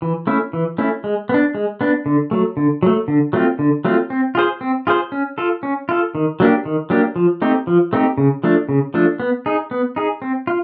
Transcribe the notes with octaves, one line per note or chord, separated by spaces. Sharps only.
E3
A3 C#4 E4
E3
A3 C#4 E4
G#3
B3 D4
G#3
B3 D4
D3
F#3 A3
D3
F#3 A3
D3
F#3 A3 C4 F4
D3
F#3 A3 C4 F4
C4
F4 G#4 C5
C4
F4 G#4 C5
C#4
F4 A4
C#4
F4 A4
D#3
F#3 A#3 D4 G4
D#3
F#3 A#3 D4 G4
F3
A3 C4 D#4 G4
F3
A3 C4 D#4 G4
C#3
F3 A3 D4
C#3
F3 A3 D4
B3
D#4 G#4
B3
D#4 G#4
C4
F4